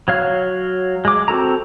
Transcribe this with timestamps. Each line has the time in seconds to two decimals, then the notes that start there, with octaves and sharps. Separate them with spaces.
0.08 F#3 C#5 F5
1.05 G#3 D6
1.28 C4 F#4 A4 A#5